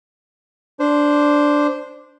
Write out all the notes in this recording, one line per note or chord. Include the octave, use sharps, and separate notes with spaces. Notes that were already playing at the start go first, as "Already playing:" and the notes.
D4 C5